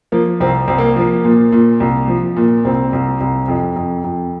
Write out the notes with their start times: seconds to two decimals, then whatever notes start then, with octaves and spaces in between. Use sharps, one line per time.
0.12 F3 A#3
0.40 C2 C4
0.68 C2 C4
0.78 A#3
0.96 F3 A#3
1.24 A#2
1.52 A#2
1.80 C2
2.08 F3
2.37 A#2
2.65 C2 C4
2.93 C2
3.20 C2
3.48 F2
3.76 F2
4.04 F2